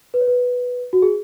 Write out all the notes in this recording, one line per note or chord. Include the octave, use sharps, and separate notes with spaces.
B4
C#5
B4
F#4
G#4